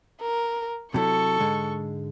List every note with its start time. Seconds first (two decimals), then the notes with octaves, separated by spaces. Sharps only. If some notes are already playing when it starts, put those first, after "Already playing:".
0.21 A#4
0.94 C3 F#3 E4 A4 C#6
1.39 G#2 D3 G#3